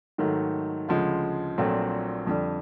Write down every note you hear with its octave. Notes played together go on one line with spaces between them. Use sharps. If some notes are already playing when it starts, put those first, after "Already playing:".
G#2 D#3 F#3 A3
D2 C#3 F3 G#3
A#1 A#2 F#3 A3 C4
F2 D3 G3